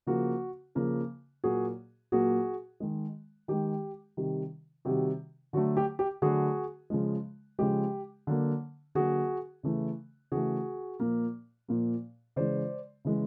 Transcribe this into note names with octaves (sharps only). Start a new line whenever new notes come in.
C#3 F3 A#3 F#4
C#3 F3 A#3
A#2 F#3 A#3 F#4 G#4
A#2 F#3 A#3 F#4 G#4
D#3 G#3
D#3 G#3 G4
C3 D#3 G3
C3 D#3 G3 F#4
D3 F#3 A3 F#4
G4
G4
D3 F#3 A3 F#4 G#4
C#3 F3 G#3
C#3 F3 G#3 G4
D3 F#3 A#3
D3 F#3 A#3 F#4 G#4
C#3 E3 A3
C#3 E3 A3 F#4 G#4
A#2 F3 A#3
A#2 F3 A#3
C#3 E3 G#3 C5 D5
C#3 E3 G#3